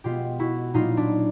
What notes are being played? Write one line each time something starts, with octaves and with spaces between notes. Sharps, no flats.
B2 G#3 B3 F4 G4
E4 F#4
A#2 F#3 A#3 D#4 F4
D4 E4